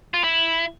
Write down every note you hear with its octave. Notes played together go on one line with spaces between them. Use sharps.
F4
E4